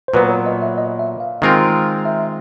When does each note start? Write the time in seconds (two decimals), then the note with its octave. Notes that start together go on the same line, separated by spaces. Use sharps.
0.08 C5
0.14 A#2 F#3 B3 B4
0.30 C#5
0.46 D#5
0.62 E5
0.78 D#5
0.99 E5
1.20 F5
1.42 D#3 G#3 C4 F4 A#4
2.05 E5